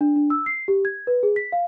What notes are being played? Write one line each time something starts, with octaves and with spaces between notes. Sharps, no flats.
D4
D4
E6
C7
G4
G#6
B4
G#4
B6
F5